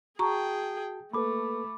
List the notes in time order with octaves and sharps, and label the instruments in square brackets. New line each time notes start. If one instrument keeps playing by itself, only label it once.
[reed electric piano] F#4 A5 [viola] G#4 G5 [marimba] A#5 C#6
[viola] A3 [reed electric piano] A#3 A4 B4 [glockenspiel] B5 D6